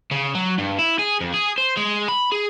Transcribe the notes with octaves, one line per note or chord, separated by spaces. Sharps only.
C#3
F#3
G2
E4
G#4
F2
G#4
C5
G#3
B5
G#4